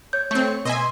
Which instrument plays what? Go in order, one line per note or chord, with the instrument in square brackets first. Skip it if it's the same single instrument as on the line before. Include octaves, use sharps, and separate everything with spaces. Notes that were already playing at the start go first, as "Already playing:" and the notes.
[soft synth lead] C#5 [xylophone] G6
[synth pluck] A3 C4 [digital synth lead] C#6
[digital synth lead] B2 [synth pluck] D#5 E5 G#5 [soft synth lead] C6